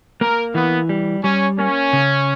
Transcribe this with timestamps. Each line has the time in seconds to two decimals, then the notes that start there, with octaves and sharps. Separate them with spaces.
0.21 A#3 A#4
0.55 E3 B3
0.89 G3
1.23 G3 C#4
1.58 A#3 C#4
1.93 C#3